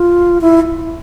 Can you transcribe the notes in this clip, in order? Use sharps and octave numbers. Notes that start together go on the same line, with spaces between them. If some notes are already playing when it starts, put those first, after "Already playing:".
Already playing: F4
E4